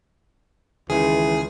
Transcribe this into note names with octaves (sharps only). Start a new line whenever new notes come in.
C#2 D#3 E3 G#4